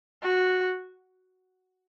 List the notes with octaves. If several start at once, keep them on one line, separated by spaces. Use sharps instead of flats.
F#4